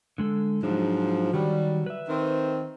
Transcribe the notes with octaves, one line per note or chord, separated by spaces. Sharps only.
D3 G#3 A4
G#2 F3 F#3 D4
D#3 F#3 G3
B4 E5
D#3 C4